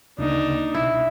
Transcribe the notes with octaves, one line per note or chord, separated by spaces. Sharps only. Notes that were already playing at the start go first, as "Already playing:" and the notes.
D2 C#3 A#3 D4 D#4
C2 B2 E4